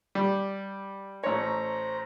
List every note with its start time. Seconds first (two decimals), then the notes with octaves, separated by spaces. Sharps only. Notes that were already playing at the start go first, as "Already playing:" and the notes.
0.15 G3
1.24 A1 C5 C#5 A#5